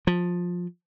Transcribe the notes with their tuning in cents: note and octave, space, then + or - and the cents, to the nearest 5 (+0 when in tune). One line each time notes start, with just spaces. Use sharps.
F3 +15